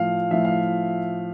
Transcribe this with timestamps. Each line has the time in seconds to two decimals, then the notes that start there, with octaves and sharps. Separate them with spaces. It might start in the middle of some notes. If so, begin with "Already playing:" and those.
Already playing: A2 F3 F5
0.31 A2 F3 E5
0.45 F5